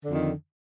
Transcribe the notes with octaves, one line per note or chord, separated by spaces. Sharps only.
F2 D3 D#3